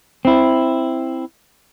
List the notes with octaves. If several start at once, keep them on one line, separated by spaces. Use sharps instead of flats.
C4 E4